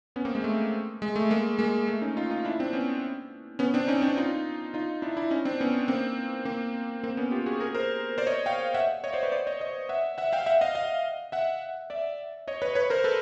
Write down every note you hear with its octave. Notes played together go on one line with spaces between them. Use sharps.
B3 C#4
A#3 C4
G#3
A3
G#3
A3
G#3 A#3
G#3 A#3
A3
C#4 D#4
D#4 F4
D#4 F4
D4 E4
C4 D4
B3 C#4
B3 C#4
C4 D4
C#4 D#4
C4 D4
D#4 F4
D#4 F4
D4 E4
D4 E4
C#4 D#4
C4 D4
B3 C#4
A#3 C4
A#3 C4
A#3 C4
B3 C#4
F4 G4
F#4 G#4
G#4 A#4
A#4 C5
C5 D5
C#5 D#5
F5 G5
E5 F#5
C#5 D#5
C5 D5
B4 C#5
C5 D5
C#5 D#5
C#5 D#5
E5 F#5
E5 F#5
F5 G5
E5 F#5
D#5 F5
D#5 F5
E5 F#5
D5 E5
C#5 D#5
B4 C#5
B4 C#5
A#4 C5
A4 B4